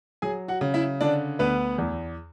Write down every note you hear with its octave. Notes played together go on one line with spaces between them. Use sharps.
F#3 G#4 G#5
F#4 F#5
C#3
E4 E5
D3 D4 D5
D2 B3 B4
E2